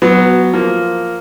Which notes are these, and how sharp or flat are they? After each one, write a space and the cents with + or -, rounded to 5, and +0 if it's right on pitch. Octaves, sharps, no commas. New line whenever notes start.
F#3 +0 B3 +0
F3 +0 A#3 -5